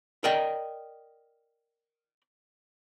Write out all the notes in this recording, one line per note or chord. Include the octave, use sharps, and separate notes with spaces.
A#4 D5 D#5 G5